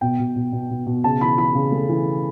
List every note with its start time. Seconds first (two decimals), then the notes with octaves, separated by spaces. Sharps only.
0.01 B2 G5
0.19 B2
0.36 B2
0.52 B2
0.70 B2
0.86 B2
1.04 C#3 A5
1.21 E3 B5
1.38 E3 B5
1.55 C#3
1.72 A3
1.89 E3